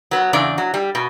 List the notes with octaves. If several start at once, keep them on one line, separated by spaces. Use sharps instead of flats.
F#3 B3
E2 C#3 D4 D5
F#3
G3
B2